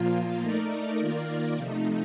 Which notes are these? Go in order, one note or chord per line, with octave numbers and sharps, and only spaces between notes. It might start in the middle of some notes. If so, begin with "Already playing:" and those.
Already playing: A#2 F3 A#3 F4
A3 D#4 A#4 D5
D#3 A#3 F4 A#4 D5
C3 F3 A3 D#4